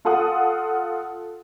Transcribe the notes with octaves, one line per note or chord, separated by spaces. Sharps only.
F4 A4 F5 F#5 D#6